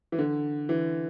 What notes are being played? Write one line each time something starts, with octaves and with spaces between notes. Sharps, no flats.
E3
D3
E3